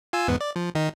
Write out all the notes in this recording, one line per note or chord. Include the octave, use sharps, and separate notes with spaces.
F4 G#5 E6
E2 G#2 B3
D5
F3
D#3 D#4